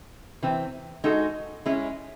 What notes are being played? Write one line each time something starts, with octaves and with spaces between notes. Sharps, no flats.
C3 E3 C4
G#3 D#4 F#4 A4
G#3 C#4 E4